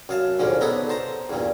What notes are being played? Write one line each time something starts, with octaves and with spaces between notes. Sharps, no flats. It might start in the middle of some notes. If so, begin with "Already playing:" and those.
F#2 F5 A5
A#1 D#2 G#2 D3 C#4
B3 D4 D#4 A4 B4 C#5
C5 A5 A#5
E2 G2 A#2